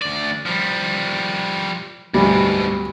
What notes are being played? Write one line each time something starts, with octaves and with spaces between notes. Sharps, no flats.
D2 D5
F3 G3
D2 G#2 B2 G3